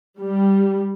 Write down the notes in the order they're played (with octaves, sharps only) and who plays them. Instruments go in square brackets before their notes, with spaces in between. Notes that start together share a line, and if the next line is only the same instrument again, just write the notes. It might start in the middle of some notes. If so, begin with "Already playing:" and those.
[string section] G3